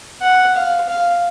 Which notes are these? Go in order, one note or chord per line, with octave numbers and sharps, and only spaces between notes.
F#5
F5
F5